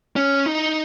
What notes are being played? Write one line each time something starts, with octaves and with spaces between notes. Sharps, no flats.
C#4
D#4